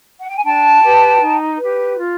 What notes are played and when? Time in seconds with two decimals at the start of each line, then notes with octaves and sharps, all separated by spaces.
0.19 F#5
0.27 G5
0.36 G#5
0.44 D4 G5 A5
0.82 G4 B4
1.20 D#4
1.58 G4 B4
1.97 F4